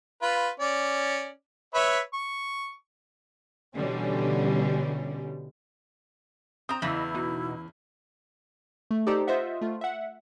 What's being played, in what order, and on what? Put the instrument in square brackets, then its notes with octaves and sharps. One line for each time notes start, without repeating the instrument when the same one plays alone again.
[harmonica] F4 B4
C#4 D5
B4 C#5 E5
C#6
[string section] B2 D3 E3 G3 C#4
[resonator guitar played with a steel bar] C4 A#5 [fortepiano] D#6
[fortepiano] E2 [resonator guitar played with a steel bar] C#3 E3 [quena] E4 [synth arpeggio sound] D#5 B5 E6
[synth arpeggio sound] B2 D#4 F#4
[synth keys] A3
D#4 G4 A4 C5 D5 A#5
F4 C5 D#5 E5 F#5
A3 F4
E5 F#5